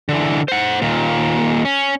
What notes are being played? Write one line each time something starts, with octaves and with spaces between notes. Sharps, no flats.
D3 E3
C5 F#5
D#2 A#2
C#4